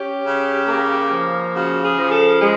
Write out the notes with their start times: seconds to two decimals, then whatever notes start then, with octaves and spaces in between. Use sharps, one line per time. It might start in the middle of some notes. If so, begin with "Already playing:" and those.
Already playing: C#4 G4
0.25 C#3
0.68 A#3
1.11 F3
1.54 C#3 F#4
1.83 G#4
1.97 F3
2.11 A4
2.40 G#3 G#4